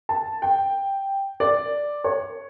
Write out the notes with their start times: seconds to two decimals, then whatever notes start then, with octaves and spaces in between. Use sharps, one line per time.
0.09 A5
0.42 G5
1.40 D5
2.04 C#5